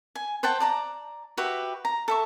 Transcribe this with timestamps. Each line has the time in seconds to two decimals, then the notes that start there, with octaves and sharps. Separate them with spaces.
0.15 G#5
0.43 C5 F#5 G5 A5
0.60 D5 A5 A#5
1.37 F#4 G4 B4 E5
1.85 A#5
2.08 A4 E5 C#6